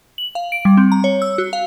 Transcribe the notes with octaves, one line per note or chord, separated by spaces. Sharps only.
F#7
F5
D7
G3
C4
A#5
C#5
E6
F#4
F5